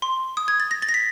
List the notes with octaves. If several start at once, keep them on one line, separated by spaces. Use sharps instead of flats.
C6
D#6
G#6
A6
A#6
A6
A#6
B6